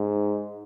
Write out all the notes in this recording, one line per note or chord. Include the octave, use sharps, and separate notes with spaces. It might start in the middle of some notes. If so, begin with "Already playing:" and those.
Already playing: G#2